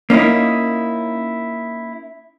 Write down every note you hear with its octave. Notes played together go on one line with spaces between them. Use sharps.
A#3 C#4 D#4 E4